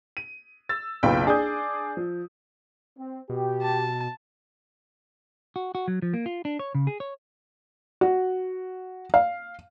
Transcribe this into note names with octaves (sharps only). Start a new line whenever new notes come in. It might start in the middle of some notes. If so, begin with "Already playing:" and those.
D#7
E6 A6
F#1 B1 F4 B4 G5
D4 G#4 D5 D6 D#6 G6
F3
C4
B2 G4
A5
F#4
F#4
F#3
F3
A#3
F4
D4
C#5
C#3
G#4
C#5
F#4
F5